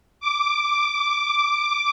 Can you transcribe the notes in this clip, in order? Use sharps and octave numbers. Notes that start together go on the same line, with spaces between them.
D6
D6